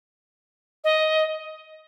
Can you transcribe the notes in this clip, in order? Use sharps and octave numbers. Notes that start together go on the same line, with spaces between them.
D#5